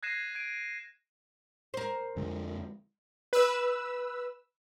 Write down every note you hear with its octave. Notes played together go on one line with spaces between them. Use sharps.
F#6 G#6 A#6 C7 D#7 E7
G#6 D7 D#7
A#4 C5
F2 D3 G#3
B4 E6